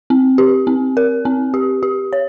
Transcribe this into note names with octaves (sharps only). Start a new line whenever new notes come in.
C4
G4
C4
A#4
C4
G4
G4
C#5